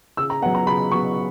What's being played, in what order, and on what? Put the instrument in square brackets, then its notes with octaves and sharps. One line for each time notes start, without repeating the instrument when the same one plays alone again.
[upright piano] C#3 E6
A#5
B3 F#5
F#3
A#5
C#3 B5
F#3 B3 C#6